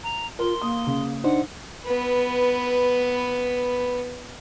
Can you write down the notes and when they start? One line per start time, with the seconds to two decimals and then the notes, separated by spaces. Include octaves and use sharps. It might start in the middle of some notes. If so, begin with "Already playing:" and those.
0.03 A#5
0.39 F4 A#4 C6
0.62 A#3 D#6
0.87 C#3
1.24 D4 D#4 C5 F#5
1.85 B3 B4